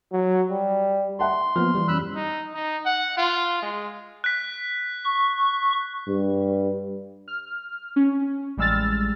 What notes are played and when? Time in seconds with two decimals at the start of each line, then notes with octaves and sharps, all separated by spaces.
0.12 F#3
0.50 G3
1.19 E5 F#5 A5 C6
1.56 F3 A#3 B3 F6
1.75 E3 G3
1.88 F#2 B5 E6 F#6
2.16 D#4
2.54 D#4
2.85 F#5
3.17 F4
3.62 G#3
4.24 F#6 B6
5.05 C#6
6.08 G2
7.28 F6
7.96 C#4
8.57 A1 G3 G#3 E6 F6 A6